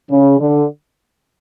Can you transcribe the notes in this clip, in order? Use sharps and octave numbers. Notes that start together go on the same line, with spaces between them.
C#3
D3